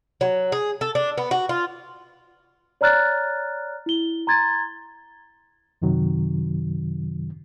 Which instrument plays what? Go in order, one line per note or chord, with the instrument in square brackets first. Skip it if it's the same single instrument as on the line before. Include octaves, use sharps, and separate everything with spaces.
[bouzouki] F#3
G#4
A4
D4
B3
F#4
F4
[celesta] C#5 D5 A#5 F6 F#6 A6
E4 G7
A#5 C6 G#6 A6
[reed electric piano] F#2 C3 D#3 F#3